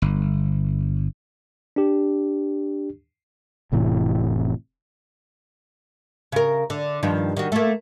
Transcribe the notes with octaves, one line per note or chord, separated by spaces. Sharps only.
G1
D4 G4
F1 A2 C3 E3
C#3 A#4
D3
G2 D#3 F3
D#3 F#4
A3 A#3